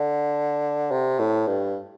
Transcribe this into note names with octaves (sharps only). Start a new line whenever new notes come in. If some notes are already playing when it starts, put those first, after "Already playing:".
Already playing: D3
C3
A2
G2